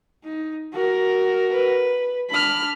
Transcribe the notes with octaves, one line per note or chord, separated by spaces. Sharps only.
D#4
F#4 A#4
B4
D4 B5 F6